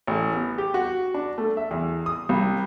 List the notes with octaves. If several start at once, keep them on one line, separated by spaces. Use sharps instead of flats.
A1
B3
G4
F#4
D4
A3
E5
E2
D#6
C2